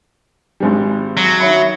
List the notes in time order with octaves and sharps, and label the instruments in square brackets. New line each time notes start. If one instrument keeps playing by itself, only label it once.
[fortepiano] G#1 G#2 G3
[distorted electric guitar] F#3
[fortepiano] D#3 C#5 B5 [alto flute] E5